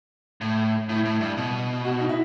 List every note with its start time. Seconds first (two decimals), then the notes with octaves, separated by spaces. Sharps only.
0.41 A2
0.89 A2 E4
1.05 A2
1.21 G2
1.37 B2
1.85 F#4
2.00 D#4
2.09 E4